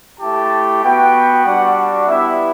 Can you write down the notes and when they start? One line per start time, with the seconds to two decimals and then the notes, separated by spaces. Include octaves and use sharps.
0.20 A3 E4 G4 A5
0.83 B3 F#4 G5
1.45 G3 D4 F#4 F#5
2.07 B3 E4 G4 E5